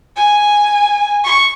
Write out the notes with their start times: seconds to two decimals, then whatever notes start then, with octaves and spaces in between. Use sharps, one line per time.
0.16 G#5
1.24 C#6